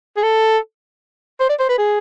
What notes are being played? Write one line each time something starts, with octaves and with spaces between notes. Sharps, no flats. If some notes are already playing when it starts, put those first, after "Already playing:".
G#4
A4
C5
D5
C5
B4
G#4